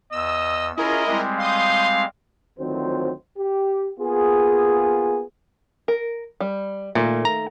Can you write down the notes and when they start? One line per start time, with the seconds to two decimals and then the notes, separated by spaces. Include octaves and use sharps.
0.12 E2 D#5 E6
0.77 C#4 E4 F4 G#4 A#4 D#5
1.07 G3 G#3 C4
1.40 F5 C6 D#6 G6
2.59 D2 D#3 F3 F#3 C4 C5
3.38 G4
4.00 A#3 B3 F4 G#4
5.88 A#4
6.40 G3
6.95 A#2 D#3 A3 A#3
7.25 A#5